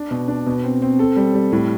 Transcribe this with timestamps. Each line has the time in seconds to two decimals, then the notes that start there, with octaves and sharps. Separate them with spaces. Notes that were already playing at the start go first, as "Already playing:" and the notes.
Already playing: D4
0.11 B2
0.28 D4
0.46 B2
0.64 C4
0.82 C4
0.99 A4
1.16 G3
1.34 G3
1.52 A2